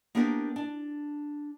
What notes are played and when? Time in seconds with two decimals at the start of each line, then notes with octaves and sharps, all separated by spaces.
0.15 A#3 B3 D4 G4 A#4 C5
0.56 D4